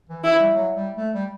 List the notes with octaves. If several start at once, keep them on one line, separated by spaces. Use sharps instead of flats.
E3
E3 E4
G3
F#3
G3
A3
G3